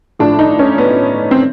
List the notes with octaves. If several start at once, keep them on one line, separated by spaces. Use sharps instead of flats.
A2 F3 D4
D#4
C#4
B3
C4